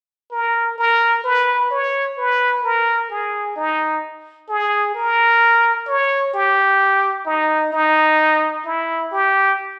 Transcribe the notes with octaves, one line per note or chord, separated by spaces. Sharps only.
A#4
A#4
B4
C#5
B4
A#4
G#4
D#4
G#4
A#4
C#5
G4
D#4
D#4
E4
G4